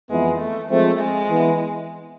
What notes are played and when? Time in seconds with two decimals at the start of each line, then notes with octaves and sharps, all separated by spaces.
0.11 F2 E3 G#3 B3 E4
0.41 A3
0.70 F3 G#3 A3 C4
1.00 G#3
1.30 E3 B3 E4